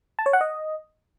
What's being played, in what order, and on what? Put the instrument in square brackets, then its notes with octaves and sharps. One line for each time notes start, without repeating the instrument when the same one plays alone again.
[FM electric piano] A5
C#5
F#5
D#5